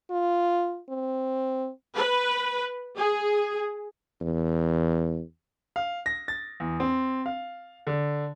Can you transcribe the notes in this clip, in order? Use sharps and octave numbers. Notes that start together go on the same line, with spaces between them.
F4
C4
B4
G#4
E2
F5
A#6
A6
E2
C4
F5
D3